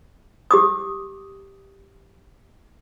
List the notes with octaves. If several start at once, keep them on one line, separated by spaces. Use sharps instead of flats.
G4 D6 D#6